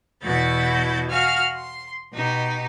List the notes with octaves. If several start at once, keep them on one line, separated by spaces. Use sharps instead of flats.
E2 B2 E4 F#4 G6 A6
F#4 F5 G#5 F6
C6
B2 D#4 G4